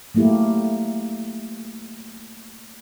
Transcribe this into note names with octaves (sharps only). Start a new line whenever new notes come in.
F#3 A3 A#3 E4 G4